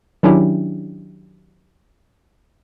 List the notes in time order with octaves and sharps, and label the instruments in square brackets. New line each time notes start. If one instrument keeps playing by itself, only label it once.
[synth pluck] D#3 F#3 C#4 D4 E4 G4